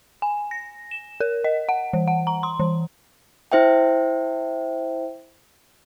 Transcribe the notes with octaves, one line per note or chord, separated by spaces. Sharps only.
G#5
A#6
E7
A#4
D#5
F#5
E3
F#5
A#5
C6
E3
E4 C5 E5 G5